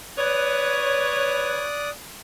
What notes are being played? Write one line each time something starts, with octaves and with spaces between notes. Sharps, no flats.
B4 C#5 D5 D#6 F#6